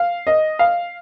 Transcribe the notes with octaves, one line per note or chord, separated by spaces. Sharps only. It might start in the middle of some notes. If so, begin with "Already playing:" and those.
Already playing: F5
D#5
F5